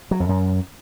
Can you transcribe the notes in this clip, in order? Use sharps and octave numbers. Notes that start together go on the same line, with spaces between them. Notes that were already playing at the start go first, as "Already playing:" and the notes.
F#3
F2
F#2